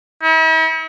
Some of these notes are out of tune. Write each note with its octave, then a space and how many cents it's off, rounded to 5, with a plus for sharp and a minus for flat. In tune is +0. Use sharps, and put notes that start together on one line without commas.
E4 -45